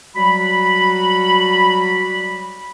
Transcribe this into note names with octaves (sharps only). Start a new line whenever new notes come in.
F#3 G3 F#4 B5